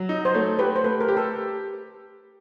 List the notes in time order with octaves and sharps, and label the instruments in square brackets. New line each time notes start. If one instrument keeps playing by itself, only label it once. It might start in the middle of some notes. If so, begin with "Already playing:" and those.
Already playing: [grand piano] F#3
D#4
[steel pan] C5
[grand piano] A3 [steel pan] C#5
[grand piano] G4 [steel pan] B4
[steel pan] C5
[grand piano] A3 [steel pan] B4
[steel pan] A#4
[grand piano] G4
[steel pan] A4